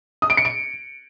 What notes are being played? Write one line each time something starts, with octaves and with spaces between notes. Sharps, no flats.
D#6
D7
C#7
D7